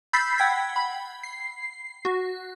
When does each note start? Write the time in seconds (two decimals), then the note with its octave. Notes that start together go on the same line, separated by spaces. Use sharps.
0.13 B5 E6 G6 A6 B6 C7
0.38 F#5 G5 G#6 B6
0.76 B5
1.23 C7
2.05 F#4